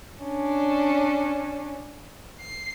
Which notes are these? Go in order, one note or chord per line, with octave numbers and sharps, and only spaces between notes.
C#4 D4
C7